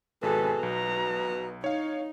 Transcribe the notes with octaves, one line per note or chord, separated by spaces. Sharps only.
G#1 B2 G#4 A4 B4
B1 A#5
D#4 C#5 F5